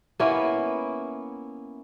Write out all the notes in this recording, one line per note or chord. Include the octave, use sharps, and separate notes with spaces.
A#3 B3 C#4 E4